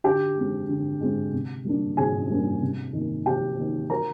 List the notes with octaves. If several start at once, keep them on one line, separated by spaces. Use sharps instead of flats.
D3 G4 G5
G#3 C4
D3
G#3 C4
C3
G3 A#3 D4
C3 G#4 G#5
G3 A#3 D4
C3
D#3 A#3
C3 G4 G5
D#3 A#3
A#4 A#5